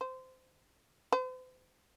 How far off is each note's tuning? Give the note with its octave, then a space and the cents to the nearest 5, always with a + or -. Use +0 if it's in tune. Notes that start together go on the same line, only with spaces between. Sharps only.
C5 -20
C5 -45